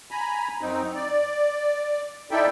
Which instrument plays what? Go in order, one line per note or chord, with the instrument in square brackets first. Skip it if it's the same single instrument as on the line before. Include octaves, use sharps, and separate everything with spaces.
[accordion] G#5 A#5 B5
F#2 C4 D#4
D5
D#4 E4 A4 D5 E5 G5